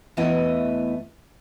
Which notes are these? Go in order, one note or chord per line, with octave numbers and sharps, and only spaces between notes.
E2 E3 A3 B3 E4 D#5